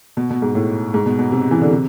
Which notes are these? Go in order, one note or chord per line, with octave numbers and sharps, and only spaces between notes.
B2
B2
G#2
A2
G#2
B2
B2
C3
E3
D3
C3